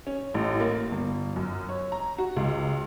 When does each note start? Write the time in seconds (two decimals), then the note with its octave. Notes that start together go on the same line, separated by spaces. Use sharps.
0.07 C#4
0.34 A1
0.60 A#3
0.91 G1
1.36 F#2
1.69 C#5
1.92 A#5
2.18 F#4
2.36 C#2